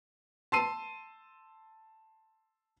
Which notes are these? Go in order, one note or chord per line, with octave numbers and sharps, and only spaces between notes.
A5 C6 E6 C7 D#7